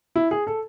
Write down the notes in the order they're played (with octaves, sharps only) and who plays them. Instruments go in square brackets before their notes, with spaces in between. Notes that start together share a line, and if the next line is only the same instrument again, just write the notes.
[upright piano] E4
G#4
A4